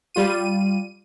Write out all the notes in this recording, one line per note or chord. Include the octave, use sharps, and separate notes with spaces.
G3 F4 D#7